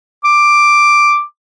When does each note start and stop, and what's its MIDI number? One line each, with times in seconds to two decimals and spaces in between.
0.24 1.22 86